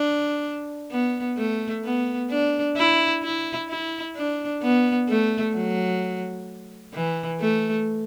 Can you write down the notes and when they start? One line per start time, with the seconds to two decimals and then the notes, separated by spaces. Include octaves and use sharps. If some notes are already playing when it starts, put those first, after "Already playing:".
Already playing: D4
0.91 B3
1.38 A3
1.84 B3
2.30 D4
2.77 E4
3.23 E4
3.69 E4
4.16 D4
4.62 B3
5.09 A3
5.55 F#3
6.94 E3
7.40 A3